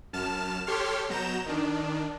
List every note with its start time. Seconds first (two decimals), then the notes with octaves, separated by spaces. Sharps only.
0.13 F#2 A5 F6 E7
0.67 G4 A4 C#5 C6 F6
1.09 B2 F#3 A#5 G6 E7
1.46 D#3 D4